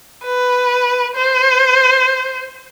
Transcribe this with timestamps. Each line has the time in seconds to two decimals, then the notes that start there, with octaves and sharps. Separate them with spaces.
0.25 B4
1.15 C5